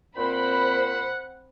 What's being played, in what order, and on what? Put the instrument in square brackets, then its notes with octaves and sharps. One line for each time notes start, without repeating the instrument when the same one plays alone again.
[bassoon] A#2 [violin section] C4 C5 B5 [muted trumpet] F#5